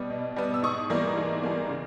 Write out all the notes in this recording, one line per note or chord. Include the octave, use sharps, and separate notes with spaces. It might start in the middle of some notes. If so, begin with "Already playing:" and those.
Already playing: B2 G3 B3
B2
G3 B3
E6
G#2 C#6 D#6
E3 G3 A#3
G#2
E3 G3 A#3
C#3